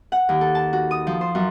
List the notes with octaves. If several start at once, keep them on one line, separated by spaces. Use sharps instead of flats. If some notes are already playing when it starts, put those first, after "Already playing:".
F#5
D#2
A4
A5
F#4
D#6
F3
C5
F#2